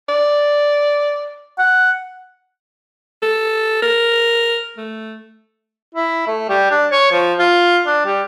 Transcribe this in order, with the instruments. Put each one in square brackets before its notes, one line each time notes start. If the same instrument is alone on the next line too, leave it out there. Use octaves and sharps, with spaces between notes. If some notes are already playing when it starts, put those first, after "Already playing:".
[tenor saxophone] D5
[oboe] F#5
[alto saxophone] A4
A#4
A3
[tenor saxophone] E4
A3
G3
D4
C#5
F3
F4
D4
G3